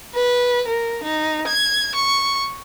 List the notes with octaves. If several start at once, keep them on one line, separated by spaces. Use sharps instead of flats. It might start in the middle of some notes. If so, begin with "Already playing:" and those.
B4
A#4
D#4
G#6
C#6